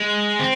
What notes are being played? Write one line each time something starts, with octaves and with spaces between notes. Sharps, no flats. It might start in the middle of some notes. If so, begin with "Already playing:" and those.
Already playing: G#3
C4